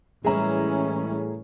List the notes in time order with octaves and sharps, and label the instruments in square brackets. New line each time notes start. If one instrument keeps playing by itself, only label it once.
[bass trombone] A2 [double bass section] E3 G3 C#4 [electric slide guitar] G#3 E4 [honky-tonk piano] G#4 A#5